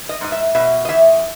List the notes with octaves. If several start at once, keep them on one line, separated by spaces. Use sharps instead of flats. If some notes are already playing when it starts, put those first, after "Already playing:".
D#5
G#2 D#5
E5
B2 E5
D#5
E2 E5